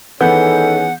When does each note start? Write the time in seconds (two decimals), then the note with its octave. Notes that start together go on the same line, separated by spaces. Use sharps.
0.21 D#3 E3 B3 C#4 G#4 A4 F#5 G6